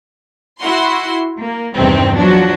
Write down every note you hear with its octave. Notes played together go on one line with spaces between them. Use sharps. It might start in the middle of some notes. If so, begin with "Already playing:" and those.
E4 F#4 C6
A#3
E2 G2 C3 D#3 C4
F3 F#3 D4 F#4